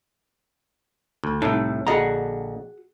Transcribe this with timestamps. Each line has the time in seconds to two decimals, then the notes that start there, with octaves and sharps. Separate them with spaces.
1.24 D2
1.42 C2 A2 D#4 A5
1.87 A#1 D3 F#4 G#4 D#5 A#5